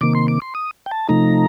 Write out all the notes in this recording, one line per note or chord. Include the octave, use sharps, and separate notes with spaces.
C3 D#3 A#3 D6
C6
D6
C6
D#6
G5
A5
C3 F3 A3 D#4 A#5